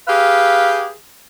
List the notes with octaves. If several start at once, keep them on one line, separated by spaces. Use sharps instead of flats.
G4 G#4 B4 F5